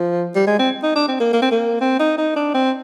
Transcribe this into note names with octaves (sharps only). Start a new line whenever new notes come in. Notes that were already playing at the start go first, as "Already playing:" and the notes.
Already playing: F3
G3
G#3
C4
D#4
D4
C4
A#3
A#3
C4
A#3
C4
D#4
D#4
D4
C4